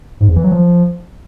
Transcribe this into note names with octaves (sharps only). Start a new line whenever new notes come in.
G#2
E2
E3
F#3
F3